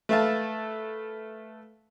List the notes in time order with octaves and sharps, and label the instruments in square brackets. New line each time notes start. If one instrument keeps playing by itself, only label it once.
[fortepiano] A3 B4 E5 F5 A5